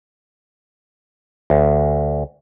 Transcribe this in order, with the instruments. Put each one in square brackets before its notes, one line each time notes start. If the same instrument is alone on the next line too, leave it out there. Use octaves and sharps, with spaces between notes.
[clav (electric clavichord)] D2